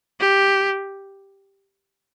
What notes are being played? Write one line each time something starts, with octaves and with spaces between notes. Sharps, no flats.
G4